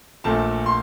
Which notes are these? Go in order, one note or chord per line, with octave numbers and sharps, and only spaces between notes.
A#1 A#2 A3 A5
C6